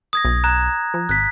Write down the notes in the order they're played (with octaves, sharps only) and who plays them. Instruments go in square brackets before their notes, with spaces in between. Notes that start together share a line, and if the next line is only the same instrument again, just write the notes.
[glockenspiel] D#6 G#6 A#6
[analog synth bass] B1
[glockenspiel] A#5 F#6 G#6
[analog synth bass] F3
[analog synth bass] G#1 [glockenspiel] F#6 B6